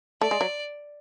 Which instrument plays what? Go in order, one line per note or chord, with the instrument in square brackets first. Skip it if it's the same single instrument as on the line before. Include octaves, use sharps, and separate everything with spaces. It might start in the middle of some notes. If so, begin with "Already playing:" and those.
[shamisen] A3 [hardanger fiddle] D5
[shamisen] G#3
F#3